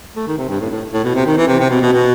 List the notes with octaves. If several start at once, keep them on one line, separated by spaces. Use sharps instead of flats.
A3
D#3
C3
G2
A2
A2
A2
B2
C3
D#3
E3
C3
C3
B2
B2
B2